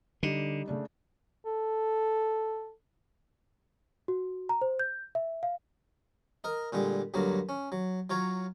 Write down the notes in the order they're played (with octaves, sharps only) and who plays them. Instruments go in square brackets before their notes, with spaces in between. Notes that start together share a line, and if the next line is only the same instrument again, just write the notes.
[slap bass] D3 [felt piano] G3 D#4
[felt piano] C#3 A3 D4
[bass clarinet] A4
[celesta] F#4
A#5
C5
G6
E5
F5
[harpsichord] A#4 D#5
A#2 D3 G3 G#3
D2 G2 F#3 A#3
C#4
F#3
F#3 F4 C#5 A#5